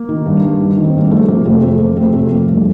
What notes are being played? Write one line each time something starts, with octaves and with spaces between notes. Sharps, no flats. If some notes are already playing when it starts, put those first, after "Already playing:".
Already playing: A#3
D#3
G2
G2
D#3
D#3
C4
G2 A#3
F3 A3
C3 A#3
F2 A3 C4
F2 A3
F3 A#3
C3 A3 C4
F2 A3 C4
F2 A#3
G2 A3